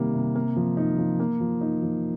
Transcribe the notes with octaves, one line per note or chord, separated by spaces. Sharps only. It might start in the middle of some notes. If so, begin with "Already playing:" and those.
Already playing: C3 D#3 G3 A#3
C3
A#3
F3
D#4
F3
A#3
F3
D#4
F3